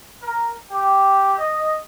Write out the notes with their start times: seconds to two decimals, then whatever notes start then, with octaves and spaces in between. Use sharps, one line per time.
0.23 A#4
0.71 G4
1.38 D#5